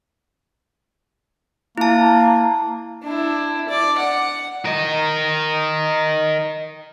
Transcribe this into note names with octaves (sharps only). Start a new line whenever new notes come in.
A#3 E4 A5
D4 E4
D5
F#5
A#4 D#5